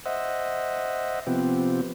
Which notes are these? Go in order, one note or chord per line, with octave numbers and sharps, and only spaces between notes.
C5 D#5 E5 F#5
C3 F3 B3 C4 G4